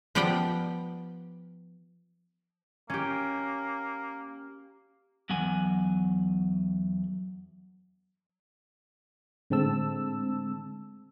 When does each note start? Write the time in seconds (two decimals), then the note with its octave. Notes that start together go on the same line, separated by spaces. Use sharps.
0.15 F3 B3 G4 D5 F#5 G5
2.90 A#3 C#4 G4
5.30 E2 F#3 F#5 G#5
9.50 A2 D3 G#3 C4 A5 E6